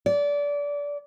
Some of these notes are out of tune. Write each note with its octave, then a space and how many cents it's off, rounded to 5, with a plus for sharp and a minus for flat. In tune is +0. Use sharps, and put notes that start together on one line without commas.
D5 -25